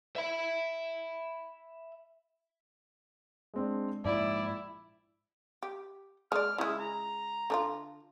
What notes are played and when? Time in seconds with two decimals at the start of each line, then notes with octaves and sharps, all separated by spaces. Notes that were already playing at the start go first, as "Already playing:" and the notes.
0.16 E5 B5
3.54 G#3 C4 D4
4.05 A#1 G#2 E4 D5
5.63 G4
6.32 G#3 D5 F6
6.58 C#3 G#3 E4
6.80 A#5
7.50 D3 D4 F4